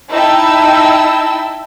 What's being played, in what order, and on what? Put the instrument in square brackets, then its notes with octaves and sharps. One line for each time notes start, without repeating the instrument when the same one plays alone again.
[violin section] D#4 E4 G5 A5 B5 E6